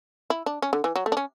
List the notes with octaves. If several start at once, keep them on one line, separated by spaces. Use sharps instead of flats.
E4
D4
C#4
D3
E3
F#3
A3
D4
C#4